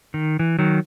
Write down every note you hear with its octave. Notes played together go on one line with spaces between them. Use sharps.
D#3
E3
D#3 F#3